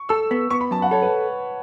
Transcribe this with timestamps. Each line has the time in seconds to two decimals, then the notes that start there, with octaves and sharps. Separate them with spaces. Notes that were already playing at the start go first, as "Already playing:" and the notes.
Already playing: C#6
0.09 A4 E6
0.31 B3
0.50 B3 C#6
0.61 B5
0.71 F#2 A5
0.82 F#5
0.91 A4 C#5
1.02 B4